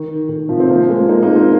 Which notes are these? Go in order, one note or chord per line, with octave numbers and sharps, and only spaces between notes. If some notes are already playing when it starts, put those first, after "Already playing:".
Already playing: D#3
D#3
C3 F3
C4
F3 A#3
G#3 C4
A#3 D#4
A#3 D#4
C4 F4